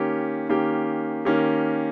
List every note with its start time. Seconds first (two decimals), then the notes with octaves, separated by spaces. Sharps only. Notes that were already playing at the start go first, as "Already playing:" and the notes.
Already playing: D#3 A#3 C#4 G4
0.49 D#3 A#3 C#4 G4
1.25 D#3 A#3 C#4 G4